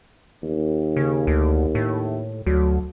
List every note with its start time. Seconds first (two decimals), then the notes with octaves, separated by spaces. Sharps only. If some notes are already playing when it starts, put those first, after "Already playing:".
0.43 D#2
0.97 C#3
1.27 D2
1.75 A2
2.46 D2 F#3